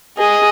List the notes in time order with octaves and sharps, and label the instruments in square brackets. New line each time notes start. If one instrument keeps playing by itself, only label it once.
[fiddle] G#4 [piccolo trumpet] D#5